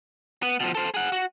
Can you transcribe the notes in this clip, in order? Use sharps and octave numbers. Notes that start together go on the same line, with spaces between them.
B3
B2 F3
A4 C5
G#4 F#5
F#4